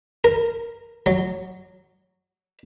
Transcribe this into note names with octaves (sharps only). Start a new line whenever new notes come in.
A#4
F#3